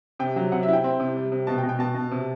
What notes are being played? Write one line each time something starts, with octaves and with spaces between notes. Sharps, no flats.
C3 G5
F#3
C3 F#5
E5
E4
G5
C4
C3
G3
C3
B2 A5
G5
B2
G5
B2 A5
B2
C3